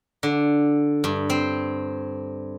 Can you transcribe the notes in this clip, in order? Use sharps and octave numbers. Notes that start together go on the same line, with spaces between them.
D3
G2
C4